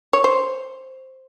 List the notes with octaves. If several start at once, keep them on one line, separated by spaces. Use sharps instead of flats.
C#5
C5